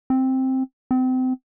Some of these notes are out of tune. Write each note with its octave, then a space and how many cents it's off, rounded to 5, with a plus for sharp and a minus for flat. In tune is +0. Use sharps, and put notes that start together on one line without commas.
C4 +5
C4 -30